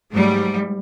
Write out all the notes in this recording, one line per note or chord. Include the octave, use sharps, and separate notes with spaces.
G#2 F#3 G3 A3